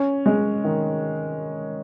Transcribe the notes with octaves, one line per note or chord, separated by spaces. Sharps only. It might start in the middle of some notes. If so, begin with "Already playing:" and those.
Already playing: C#4
G#3
D#3